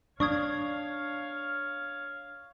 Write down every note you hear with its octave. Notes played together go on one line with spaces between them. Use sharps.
D4 C#5 F5 C#6 D#6 G#6